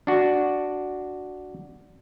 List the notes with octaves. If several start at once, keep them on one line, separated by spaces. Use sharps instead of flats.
D4 F#4